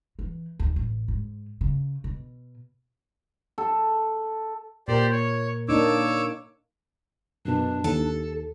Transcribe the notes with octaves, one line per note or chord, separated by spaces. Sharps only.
E3
D#2
A1
G#2
C#3
B2
A4
A#2 G4 A#4 C5 D5
C#5
A#3 D4 D#4 C#5 D6 E6
F#2 B2 D4
D#2 A4